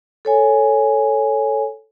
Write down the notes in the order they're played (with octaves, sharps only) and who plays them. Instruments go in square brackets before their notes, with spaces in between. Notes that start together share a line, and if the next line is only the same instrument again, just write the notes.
[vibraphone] A4 C#5 G#5